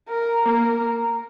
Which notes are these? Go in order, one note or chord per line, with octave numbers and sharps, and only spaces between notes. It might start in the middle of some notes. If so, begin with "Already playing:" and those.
A#4
A#3 A#4